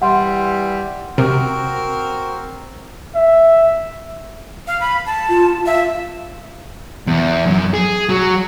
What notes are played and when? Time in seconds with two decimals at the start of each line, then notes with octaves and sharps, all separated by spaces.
0.02 E3 G3 F#5 C6
1.18 C3 C4 F#4 A#4
3.15 E5
4.67 F5
4.81 B5
5.06 A5
5.29 F4
5.66 E5 F5
7.07 E2
7.47 F#2
7.74 G#4
8.09 F#3